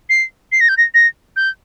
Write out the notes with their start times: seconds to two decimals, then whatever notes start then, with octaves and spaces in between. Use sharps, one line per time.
0.10 C7
0.52 C7
0.60 A#6
0.69 G6
0.77 A#6
0.94 A#6
1.36 G6